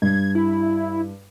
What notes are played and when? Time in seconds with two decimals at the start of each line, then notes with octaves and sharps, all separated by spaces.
0.02 G2 G#6
0.35 E4